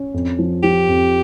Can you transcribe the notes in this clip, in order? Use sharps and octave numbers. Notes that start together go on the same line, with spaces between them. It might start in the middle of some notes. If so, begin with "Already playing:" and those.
Already playing: C#4
F2
F3
F3 G4
F2